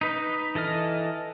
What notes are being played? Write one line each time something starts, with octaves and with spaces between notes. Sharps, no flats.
D#4 B4
E3 A4 D#5 F6